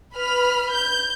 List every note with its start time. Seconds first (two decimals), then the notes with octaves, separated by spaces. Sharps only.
0.15 B4 B5 F6
0.73 G6